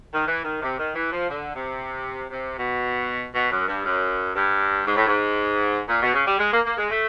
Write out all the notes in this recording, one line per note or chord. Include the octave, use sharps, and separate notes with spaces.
D#3
E3
D#3
C3
D#3
E3
F3
D3
C3
C3
B2
B2
F#2
G2
F#2
G2
G#2
A2
G#2
A#2
B2
C#3
G3
G#3
A#3
A#3
G#3
A3